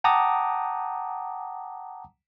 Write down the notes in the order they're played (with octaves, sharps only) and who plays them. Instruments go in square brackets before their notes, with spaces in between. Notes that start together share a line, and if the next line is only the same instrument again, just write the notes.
[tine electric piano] F#5 G5 A5 A#5 D6 D#6